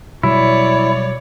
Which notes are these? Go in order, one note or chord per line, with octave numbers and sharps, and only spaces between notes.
B2 F#3 G3 E4 C#5 D5